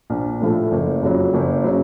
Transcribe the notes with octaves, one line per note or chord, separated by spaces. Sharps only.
A#1
A2 F3 A3
F#1
F2 C#3 F#3
F#1
C#3 F#3